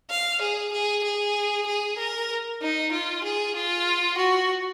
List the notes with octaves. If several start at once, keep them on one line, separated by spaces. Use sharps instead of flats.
F5
G#4
G#4
G#4
G#4
A#4
D#4
F4
G#4
F4
F#4